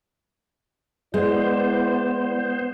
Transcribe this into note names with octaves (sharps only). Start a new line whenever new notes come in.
G#3 B3 E4 C5 D5